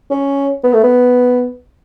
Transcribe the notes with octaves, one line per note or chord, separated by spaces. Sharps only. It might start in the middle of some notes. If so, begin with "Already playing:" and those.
C#4
B3
A3
B3